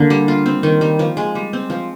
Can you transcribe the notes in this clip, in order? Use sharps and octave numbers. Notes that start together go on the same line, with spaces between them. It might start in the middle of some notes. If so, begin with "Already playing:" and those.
Already playing: D3 A#3
G3
F4
C4
D#3
G3
F3
G#3
G3
C4
F3